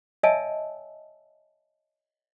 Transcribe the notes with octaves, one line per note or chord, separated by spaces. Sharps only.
C#5 D#5 E5 G#5 A5 E6